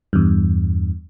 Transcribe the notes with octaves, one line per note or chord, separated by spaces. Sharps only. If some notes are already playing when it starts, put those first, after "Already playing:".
E2 G2